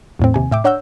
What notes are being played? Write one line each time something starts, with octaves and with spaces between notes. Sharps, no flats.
E2 A2 C4
D#2 C3 G#5
A2 E5 G5 D6
D4 C#5 F#5 A#5 E6 G6